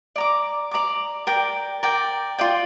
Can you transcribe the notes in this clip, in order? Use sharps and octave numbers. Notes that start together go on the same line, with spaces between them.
D5 A#5 D6
D5 A#5 D6
A#4 D5 G5
A#4 D5 G5
F4 D5 G5